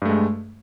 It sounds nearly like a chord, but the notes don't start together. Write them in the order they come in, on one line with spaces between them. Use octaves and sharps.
G2 A3 G#3